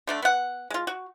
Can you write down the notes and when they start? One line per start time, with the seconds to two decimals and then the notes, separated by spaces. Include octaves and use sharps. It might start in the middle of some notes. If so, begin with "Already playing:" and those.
0.07 D3 A3 D4
0.22 B3 F#5
0.70 G#3 F4
0.87 F#4